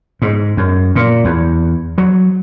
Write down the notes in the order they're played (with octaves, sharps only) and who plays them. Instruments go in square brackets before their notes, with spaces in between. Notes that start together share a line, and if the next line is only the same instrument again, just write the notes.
[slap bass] G#2
F#2
A#2
E2
F#3